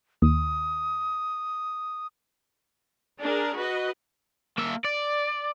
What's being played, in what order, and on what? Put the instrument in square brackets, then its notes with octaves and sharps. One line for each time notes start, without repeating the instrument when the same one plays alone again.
[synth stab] D#2 [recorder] D#6
[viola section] D4 G#4 A#4
F#4 B4 D#5
[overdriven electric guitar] A#3 E5
D5